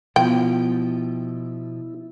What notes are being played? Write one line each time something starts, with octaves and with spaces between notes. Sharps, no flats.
B2 F3 B3 E4 F4 G5